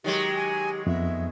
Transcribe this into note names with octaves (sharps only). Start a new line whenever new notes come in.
D#3 F#3 G#3 G4
G#5
F2 B3 E5